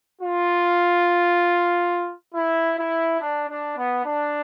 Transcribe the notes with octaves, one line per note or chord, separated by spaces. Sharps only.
F4
E4
E4
D4
D4
B3
D4